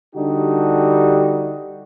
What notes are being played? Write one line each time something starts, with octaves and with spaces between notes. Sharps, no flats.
D3 G3 D4 D#4 F#4 G4